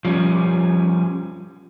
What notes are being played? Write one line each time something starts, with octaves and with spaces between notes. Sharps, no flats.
F3 G3 C#4